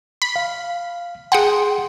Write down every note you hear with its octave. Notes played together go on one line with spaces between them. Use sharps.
B5
F5
G#4 F#5 G5 C6 D#6